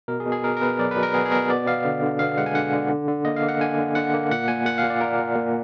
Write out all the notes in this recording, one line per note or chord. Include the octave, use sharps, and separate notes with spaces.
B2 A#4
G#4
B2
G#4
B2 A#4
A#4
B3 B4
F#3 D5
B4
B2
A#4
B3 G#4
G#4
B2 A#4
B3 D5
B3 F5
D3
D3
B3 F5
G#3 F#5
G#5
D3 F#5
D3
D3
D3
A#3 D#5
F5
A#3
F#5
D3 G#5
D3
D3 F#5
A#3
A#2 F#5
A#2 G#5
A#2 F#5
F5
A#2
D5
A#2 A#4
A#2
A#2